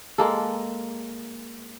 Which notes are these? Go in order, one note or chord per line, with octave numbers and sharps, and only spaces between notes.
G#3 A#3 A4